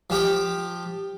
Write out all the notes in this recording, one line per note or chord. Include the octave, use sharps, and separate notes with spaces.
F3 G4 D6